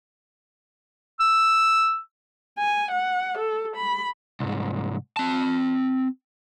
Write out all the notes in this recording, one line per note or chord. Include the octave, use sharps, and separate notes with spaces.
E6
G#5
F#5
A4
B5
C2 G#2
C4 A5